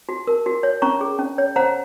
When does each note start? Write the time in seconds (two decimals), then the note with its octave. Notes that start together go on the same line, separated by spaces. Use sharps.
0.09 F#4
0.27 A#4
0.46 F#4
0.63 C#5
0.82 C#4 A#5 C#6
1.01 G#4
1.19 C#4
1.38 C#5
1.56 C5 F#5 A#5